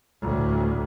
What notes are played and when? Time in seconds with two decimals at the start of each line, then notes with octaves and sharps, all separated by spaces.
0.22 D2 A2